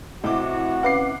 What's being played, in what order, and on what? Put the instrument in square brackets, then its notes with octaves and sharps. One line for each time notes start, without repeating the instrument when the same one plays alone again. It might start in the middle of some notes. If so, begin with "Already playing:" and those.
[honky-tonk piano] A2 D6 [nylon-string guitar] C3 E4 D#5 [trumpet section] F#4
[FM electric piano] C#4 B4 F5 [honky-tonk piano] F#5 D6 C7